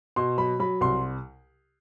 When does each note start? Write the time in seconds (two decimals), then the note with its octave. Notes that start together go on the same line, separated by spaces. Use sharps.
0.16 B2 C6
0.38 F#3 B5
0.60 F#3 B5
0.81 C2 C6